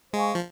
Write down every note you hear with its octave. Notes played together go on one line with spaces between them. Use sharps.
G#3 C5 F5 G#5 C#6
F3